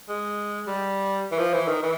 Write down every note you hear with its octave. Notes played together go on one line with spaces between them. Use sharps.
G#3
G3
E3
F3
E3
D#3
E3